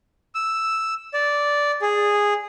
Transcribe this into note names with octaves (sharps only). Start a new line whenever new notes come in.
E6
D5
G#4